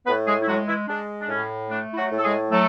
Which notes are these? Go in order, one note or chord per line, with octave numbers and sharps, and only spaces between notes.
A2 B3 B4
G#3 G#4
E4
F#3 G#3 F#4
E3 E4
G#3 D4
D4
A2 C#4
A3 D4
E4
F#3 F#4
A2
A4
G#3 G#4
F#3 A3 A4